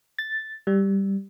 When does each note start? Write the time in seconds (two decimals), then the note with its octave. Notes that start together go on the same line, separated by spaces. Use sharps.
0.19 A6
0.67 G3